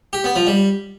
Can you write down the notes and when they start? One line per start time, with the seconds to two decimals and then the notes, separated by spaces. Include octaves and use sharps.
0.13 G4
0.24 B3
0.36 F3
0.47 G3